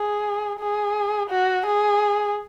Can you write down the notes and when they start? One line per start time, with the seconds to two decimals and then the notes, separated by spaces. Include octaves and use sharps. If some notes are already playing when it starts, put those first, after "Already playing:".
Already playing: G#4
0.60 G#4
1.30 F#4
1.66 G#4